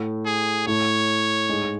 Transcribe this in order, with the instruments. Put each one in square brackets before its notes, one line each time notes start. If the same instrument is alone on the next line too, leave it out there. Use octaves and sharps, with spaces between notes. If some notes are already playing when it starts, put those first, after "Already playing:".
Already playing: [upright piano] A2 A3
[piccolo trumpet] G#4
[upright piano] A2 A3 [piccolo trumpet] C#5
[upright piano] G#2 G#3
G#3